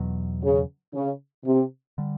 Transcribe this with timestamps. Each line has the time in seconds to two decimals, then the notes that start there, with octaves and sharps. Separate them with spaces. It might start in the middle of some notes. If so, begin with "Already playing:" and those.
Already playing: E2 B2 F#3
0.43 C#3
0.94 C#3
1.46 C3
1.98 D3 G3